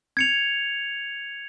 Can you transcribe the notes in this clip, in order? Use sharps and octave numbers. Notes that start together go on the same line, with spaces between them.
G#6 C#7 F7